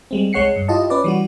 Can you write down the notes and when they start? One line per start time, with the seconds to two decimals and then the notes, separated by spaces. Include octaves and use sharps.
0.11 G3 G#3 C4
0.33 C#2 G#3 C#5 F#5 C7 C#7
0.56 G2
0.68 E4 F4 G4 D#5 A5
0.90 C#4 B4 D5
1.04 E3 G3 F#4